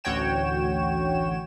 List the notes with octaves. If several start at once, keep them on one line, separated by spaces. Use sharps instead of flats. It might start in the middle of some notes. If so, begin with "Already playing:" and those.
A1 D2 F#4 C#5 G5 E7